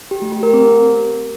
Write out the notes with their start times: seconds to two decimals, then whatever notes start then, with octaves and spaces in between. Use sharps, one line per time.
0.11 G4
0.22 A3
0.32 G4
0.43 A#4
0.53 C4